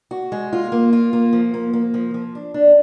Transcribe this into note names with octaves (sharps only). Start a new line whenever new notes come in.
F#4
G#3
F4
A#3
F4
A#3
F3
A#3
A#3
F3
F3
D4
D4